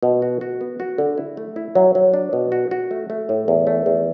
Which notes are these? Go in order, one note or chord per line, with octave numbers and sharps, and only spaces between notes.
B2
F#4
F#4
B3
F#4
D3
E4
A3
E4
F#3
F#3
D4
B2
F#4
F#4
A3
A3
A2
E2
A3
E2